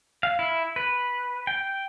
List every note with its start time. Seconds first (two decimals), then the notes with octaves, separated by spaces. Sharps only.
0.23 F5
0.39 E4
0.76 B4
1.47 G5